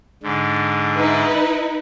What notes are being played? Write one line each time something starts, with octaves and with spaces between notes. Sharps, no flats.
G#2 D3
D#4 E4 B4